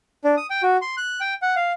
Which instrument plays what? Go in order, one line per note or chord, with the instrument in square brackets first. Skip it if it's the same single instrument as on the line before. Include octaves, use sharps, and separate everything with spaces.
[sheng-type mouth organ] D4
D#6
G5
F#4
C6
F#6
G5
F#5
F5